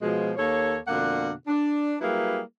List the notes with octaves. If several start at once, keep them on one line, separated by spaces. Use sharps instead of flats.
B2 F3 G#3
D#2 A#3 A4 C#5
F2 B2 D3 A#3 D4 F#5
D4
F#3 G3 A#3 E4 G#4 B4